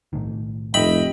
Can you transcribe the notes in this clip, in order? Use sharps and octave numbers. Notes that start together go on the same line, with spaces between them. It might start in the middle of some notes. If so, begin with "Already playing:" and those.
B1 A2 D#3
F1 D#5 E5 G5 B5